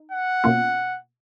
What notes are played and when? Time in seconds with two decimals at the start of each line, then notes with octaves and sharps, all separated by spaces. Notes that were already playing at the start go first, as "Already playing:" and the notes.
Already playing: D#4
0.11 F#5
0.44 B2 A#3 C#4 F4